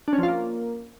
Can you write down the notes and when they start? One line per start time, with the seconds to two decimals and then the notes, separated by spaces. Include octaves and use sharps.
0.08 D4
0.13 C#4
0.18 F3
0.23 F4
0.28 A#3